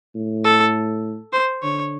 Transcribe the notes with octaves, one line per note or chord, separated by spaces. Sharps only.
A2
A4
C5
D3 C#5